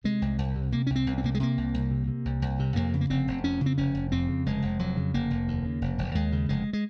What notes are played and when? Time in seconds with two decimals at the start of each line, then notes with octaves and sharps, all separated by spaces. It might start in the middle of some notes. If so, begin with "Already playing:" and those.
0.04 C3 G#3
0.22 C2
0.38 C2
0.56 C3
0.72 C3 A#3
0.87 C2 C#4
0.96 C4
1.07 C2
1.18 C4
1.24 C3 A#3
1.35 G#3
1.40 C3 A#3
1.57 C2
1.74 C2
1.91 C3
2.08 C3
2.25 C2
2.42 C2
2.59 C3
2.76 F2 A#3
2.94 C#3
3.01 A#3
3.10 F1 C4
3.27 F1
3.44 F2 C#4
3.61 C#3
3.66 C4
3.78 F1 C#4
3.94 F1
4.12 F2 C4
4.28 C#3
4.46 F1 G#3
4.62 F1
4.79 F2 F#3
4.97 C#3
5.14 F1 A#3
5.30 F1
5.48 D#2
5.65 C#3
5.81 F1
5.98 F1
6.15 D#2 G#3
6.32 C#3
6.49 F1 G#3
6.73 G#3